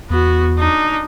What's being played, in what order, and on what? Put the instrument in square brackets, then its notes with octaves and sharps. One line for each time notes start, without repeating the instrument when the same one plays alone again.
[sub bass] E2 [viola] B3 F#4
[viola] D4 D#4